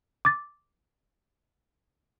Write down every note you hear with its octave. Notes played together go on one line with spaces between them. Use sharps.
D6 A6